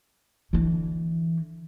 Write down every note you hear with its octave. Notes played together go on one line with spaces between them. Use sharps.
D3 E3